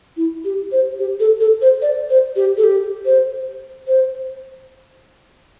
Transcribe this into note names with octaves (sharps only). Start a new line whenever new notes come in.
E4
G4
C5
G4
A4
A4
C5
D5
C5
G4
A4
G4
C5
C5